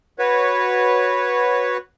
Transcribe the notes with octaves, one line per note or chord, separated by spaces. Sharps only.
F#4 B4 C#5